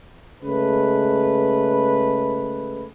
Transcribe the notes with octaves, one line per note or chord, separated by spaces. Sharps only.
C#3 G#3 A3 B4